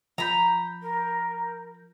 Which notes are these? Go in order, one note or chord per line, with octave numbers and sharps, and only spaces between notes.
F3 A#5 B5 G6
A#4